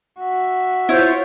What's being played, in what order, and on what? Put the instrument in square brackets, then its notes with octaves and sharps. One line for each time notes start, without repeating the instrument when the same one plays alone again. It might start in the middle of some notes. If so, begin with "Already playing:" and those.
[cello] F#4 E5
[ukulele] E4 [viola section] F4 C#5 [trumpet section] C5